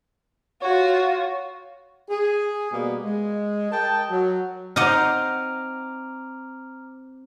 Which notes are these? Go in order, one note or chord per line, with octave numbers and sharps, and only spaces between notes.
F4 F#4 C#5
G#4
B2 G3 A#3 B3
G#3
A#4 D#5 G5 A5
F#3
C4 D#4 C5 D#5 F#5 A#5 D6 F6